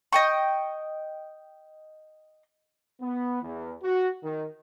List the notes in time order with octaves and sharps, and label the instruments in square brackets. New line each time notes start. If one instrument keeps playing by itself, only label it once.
[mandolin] D#5 G5 C#6
[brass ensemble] B3
E2
F#4
D#3